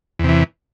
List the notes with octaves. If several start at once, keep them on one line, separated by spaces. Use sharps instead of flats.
E2 C3 E3